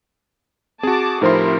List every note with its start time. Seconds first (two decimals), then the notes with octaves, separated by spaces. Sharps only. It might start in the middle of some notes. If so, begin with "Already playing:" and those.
0.83 C4 F#4 G#4 A5 D6
1.22 A2 C3 F3 D#4 E4 A#4 C5 C6